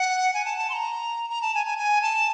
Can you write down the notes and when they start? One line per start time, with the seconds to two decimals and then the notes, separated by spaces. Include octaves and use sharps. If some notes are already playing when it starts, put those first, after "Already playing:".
Already playing: F#5
0.34 G#5
0.45 A5
0.58 A5
0.70 C6
0.73 A#5
1.30 A#5
1.42 A5
1.55 G#5
1.66 G#5
1.78 G#5
2.02 A5